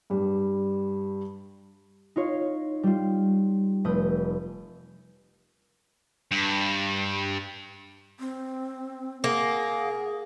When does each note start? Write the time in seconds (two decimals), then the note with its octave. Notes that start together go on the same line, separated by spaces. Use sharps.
0.10 G2 G3
2.16 D#4 F4 C#5 F5
2.83 G3 F4
3.84 F1 A3 B4 D#6 G6
6.31 G2
8.20 C4
9.24 A#3 G#4 F#5